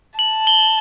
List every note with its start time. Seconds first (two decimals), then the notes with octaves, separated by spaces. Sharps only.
0.19 A5 F#7
0.47 G7